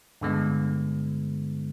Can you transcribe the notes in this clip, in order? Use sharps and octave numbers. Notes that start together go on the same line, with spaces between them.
G2 D3 G#3 B3